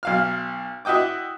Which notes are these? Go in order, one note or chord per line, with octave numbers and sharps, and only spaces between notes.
B1 F5 F6
E4 F#4 D#5 G5 D6